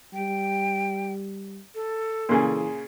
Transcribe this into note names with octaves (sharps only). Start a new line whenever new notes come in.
G3 G5
A4
A#2 C#3 E3 G#4